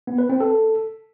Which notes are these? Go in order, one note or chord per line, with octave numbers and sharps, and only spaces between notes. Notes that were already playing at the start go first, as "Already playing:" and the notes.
B3
B4
C4
A4